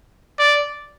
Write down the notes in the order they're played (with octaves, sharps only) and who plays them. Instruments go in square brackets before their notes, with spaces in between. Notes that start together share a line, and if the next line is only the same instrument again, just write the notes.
[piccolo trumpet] D5